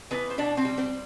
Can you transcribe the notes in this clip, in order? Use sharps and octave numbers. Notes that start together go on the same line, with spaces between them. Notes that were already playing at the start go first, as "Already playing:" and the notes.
E3 B3 B4
C5
B2 D4 D5
C4 C5
G3
C4 C5